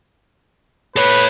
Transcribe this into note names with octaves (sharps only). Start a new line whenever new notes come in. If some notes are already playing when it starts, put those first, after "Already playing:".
A4 B4 C#5